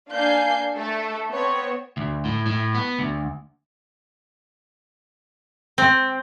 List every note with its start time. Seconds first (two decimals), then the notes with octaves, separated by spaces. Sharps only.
0.11 A#3 D4 F5 G#5 G6 C7
0.75 A3 A4
1.30 B3 C4 C#5
1.97 D2
2.25 A2
2.46 A2
2.75 B3
2.99 D2
5.78 C4